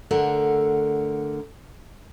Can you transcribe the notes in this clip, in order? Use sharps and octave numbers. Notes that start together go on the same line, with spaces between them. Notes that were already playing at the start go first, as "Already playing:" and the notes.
D3 A3 A#4 F#5